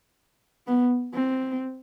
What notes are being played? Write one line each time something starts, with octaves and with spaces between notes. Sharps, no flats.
B3
C4